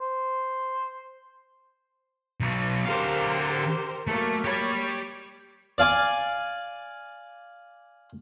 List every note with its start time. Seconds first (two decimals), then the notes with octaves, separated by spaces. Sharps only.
0.01 C5
2.40 B1 B2
2.86 D3 G4 A#4 C5 F5
4.07 F#3 A3 A#3
4.45 G4 C#5 B5
5.78 D5 F5 G#5 D6